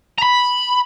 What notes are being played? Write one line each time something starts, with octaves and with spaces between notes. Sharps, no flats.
A#5 B5